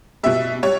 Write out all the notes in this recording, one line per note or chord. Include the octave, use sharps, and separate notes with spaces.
B2 G3 E5
G3 C#5